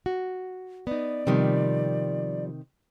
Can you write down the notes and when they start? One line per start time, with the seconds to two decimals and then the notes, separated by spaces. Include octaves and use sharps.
0.06 F#4
0.87 B3 D#4 D5
1.27 C3 D#3 F3 G3